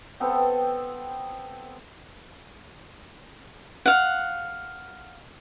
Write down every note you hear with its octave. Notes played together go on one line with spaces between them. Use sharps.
B3 C4 A4 G5
F5 F#5